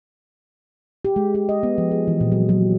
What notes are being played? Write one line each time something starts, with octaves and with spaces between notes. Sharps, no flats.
G4
G#3
G4
D#5
B3
F3
G#4
E3
A#2
F#3
F#3